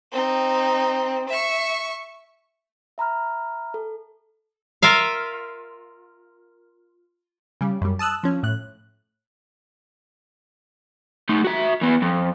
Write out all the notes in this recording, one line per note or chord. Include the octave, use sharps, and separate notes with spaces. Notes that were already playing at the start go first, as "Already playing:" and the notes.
C4 D#4
E5 C#6
E5 A#5 B5 F6
A4
F4 A#4 E5 F5
C#3 G3
F#2 G3
A5 D#6 E6 F#6
F3 C#4
A2 F#6
A3 D#4
F#4 E5
E3 B3
F2